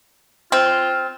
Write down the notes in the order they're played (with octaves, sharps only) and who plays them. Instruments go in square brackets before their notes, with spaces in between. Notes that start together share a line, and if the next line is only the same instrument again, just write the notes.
[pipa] C4 [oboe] F4